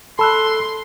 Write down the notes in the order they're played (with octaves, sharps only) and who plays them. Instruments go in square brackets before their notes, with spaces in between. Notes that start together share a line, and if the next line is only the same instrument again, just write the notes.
[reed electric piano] A4 E6 F#6 [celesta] A5 B5 [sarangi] C6